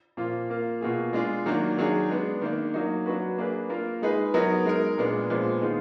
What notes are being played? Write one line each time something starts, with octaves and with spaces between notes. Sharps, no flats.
A#2 F3 A#3 F4
A#3 F4 A#4
B2 A#3 F4 G#4
G#3 D4 F4 G#4
D#3 F#3 A#3 D4
D#3 F#3 D4 G#4
G#3 B3 D4
D#3 A#3 D4
F#3 A#3 D#4
F#3 D4 F#4 B4
A#3 D4 G#4 B4
A#3 F4 A#4
G#3 D#4 G#4 B4
F#3 B3 D#4 A#4
G#3 D#4 A#4
A#2 G#3 B3 D4
A#2 F3 G#3 B3
D#3 G#3 B3 F4 G#4